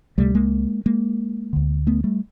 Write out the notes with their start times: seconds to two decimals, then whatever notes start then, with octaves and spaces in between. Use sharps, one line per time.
0.18 C#2 C3 G3 A3
0.35 G#3 A#3
0.86 G#3 A#3
1.53 D2 D3
1.87 A3 B3
2.04 G3 A3